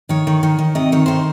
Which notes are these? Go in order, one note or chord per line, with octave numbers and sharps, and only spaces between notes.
D#3 C#5
D#3
D#3
D#3
C3 D#5
D#3 C#5
D#3 C5